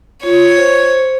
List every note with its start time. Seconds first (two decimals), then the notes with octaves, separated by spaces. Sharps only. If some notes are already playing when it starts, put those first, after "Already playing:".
0.23 F4 C#5
0.57 C5